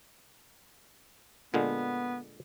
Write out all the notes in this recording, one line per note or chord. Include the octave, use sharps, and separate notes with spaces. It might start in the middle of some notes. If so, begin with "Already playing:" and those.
A#2 D3 G#3 B3